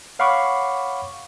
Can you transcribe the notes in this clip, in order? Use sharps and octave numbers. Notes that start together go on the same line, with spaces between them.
C#5 F5 F#5 B5 C#6 D6